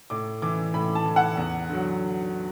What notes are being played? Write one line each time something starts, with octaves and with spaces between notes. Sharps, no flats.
A2 D6
E3 D6
A2 B5
A5
E3
F#5
E2
D3 F#3